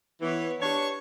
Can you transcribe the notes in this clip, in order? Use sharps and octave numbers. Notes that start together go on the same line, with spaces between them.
E3 B3 C#5
D4 G4 C#5 C#6